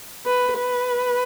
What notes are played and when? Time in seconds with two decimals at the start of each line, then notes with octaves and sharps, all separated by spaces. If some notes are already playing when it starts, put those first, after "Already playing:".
0.26 B4
0.58 B4